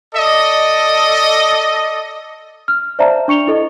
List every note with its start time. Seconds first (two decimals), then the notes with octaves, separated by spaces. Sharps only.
0.15 A4 D5 D#5
2.68 F6
2.99 C5 D5 E5 F5 A5 A#5
3.28 D4 C#6 C#7 F7 G7
3.47 E4 A4 D#5